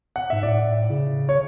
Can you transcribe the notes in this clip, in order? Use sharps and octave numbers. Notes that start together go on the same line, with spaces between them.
F#5
G#2 E5
A2 D5
C#3
C#5